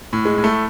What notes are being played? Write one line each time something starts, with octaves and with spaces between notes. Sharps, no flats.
A2
G#3
A2
A3